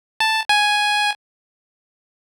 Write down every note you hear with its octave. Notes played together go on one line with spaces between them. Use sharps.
A5
G#5